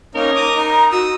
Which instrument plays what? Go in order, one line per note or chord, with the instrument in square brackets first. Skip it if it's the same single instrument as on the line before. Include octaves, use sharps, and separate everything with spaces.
[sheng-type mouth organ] A#3 C#4 D#4 [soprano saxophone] A#4
[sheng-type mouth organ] A#5 D6 D#6
[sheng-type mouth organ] D#4 [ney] A#5
[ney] F#4 [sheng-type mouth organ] D#6 E6